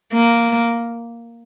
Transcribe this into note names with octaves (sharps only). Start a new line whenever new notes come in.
A#3